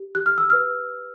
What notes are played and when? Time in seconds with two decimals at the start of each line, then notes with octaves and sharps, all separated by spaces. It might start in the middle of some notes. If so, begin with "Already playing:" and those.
Already playing: G4
0.15 G4 F#6
0.26 F6
0.38 E6
0.50 B4 F6